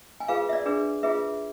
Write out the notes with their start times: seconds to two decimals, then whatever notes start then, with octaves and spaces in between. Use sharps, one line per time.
0.20 G#5
0.28 F4 G#4 B4 F5
0.49 E5
0.53 D5
0.66 D4 G#4 B4
1.03 F4 G#4 B4 E5